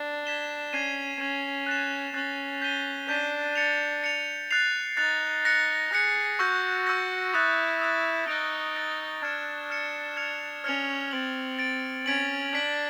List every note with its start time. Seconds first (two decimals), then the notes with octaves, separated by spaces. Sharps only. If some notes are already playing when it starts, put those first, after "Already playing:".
Already playing: D4
0.25 G#6 B6 E7 G7
0.73 C#4 G#6 C7 D#7
1.19 C#4 G#6 C7 D#7
1.67 F#6 A6 C7 E7
2.14 C#4 F#6 A6 C7 E7
2.62 G6 B6 D#7 G7
3.08 D4 G6 B6 D#7 G7
3.56 A6 C#7 F7
4.03 A6 C#7 F7
4.51 F#6 A6 C7 F7
4.97 D#4 F#6 A6 C7 F7
5.45 F#6 A#6 C#7
5.93 G#4 F#6 A#6 C#7
6.39 F#4 C#6 E6 G6 A#6
6.87 C#6 E6 G6 A#6
7.34 E4 D#6 F#6 A6
7.81 D#6 F#6 A6
8.28 D#4 F#6 A6 D7
8.76 F#6 A6 D7
9.22 D4 F6 G#6 C#7 E7
9.70 F6 G#6 C#7 E7
10.17 F6 G#6 C#7 F7
10.64 C#4 F6 G#6 C#7 F7
11.11 C4 A6 D7 F#7
11.59 A6 D7 F#7
12.06 C#4 G#6 B6 D7 F#7
12.53 D4 G#6 B6 D7 F#7